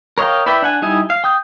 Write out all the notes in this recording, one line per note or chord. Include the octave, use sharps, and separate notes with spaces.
A#4 C#5 D#5 F5 G5
E4 B4 D5 E5 G5
D4 F#5 G#5
G3 D#4 E4 D#5 G#5
F5
G5 D#6 G6